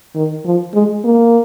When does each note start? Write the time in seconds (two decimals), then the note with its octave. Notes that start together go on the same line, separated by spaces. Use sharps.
0.15 D#3
0.45 F3
0.74 G#3
1.04 A#3